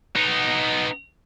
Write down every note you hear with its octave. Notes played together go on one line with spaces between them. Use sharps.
B3 D#4